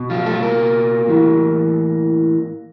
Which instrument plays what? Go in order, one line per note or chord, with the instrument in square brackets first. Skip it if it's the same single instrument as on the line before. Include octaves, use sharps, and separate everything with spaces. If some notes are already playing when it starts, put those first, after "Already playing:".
Already playing: [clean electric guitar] B2
F3 F4
A3 A4
A#3 A#4
A2 E3